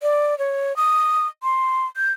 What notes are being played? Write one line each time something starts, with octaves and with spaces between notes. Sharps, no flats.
D5
C#5
D#6
C6
G6